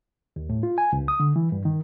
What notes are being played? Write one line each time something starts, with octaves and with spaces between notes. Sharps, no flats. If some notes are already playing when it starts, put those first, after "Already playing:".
D#2
A2
F4
G#5
C#2
D#6
D3
E3
G2
D#3